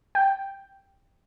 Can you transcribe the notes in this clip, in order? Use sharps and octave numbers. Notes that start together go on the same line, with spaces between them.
G5